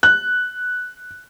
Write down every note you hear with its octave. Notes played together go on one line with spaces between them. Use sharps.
F#6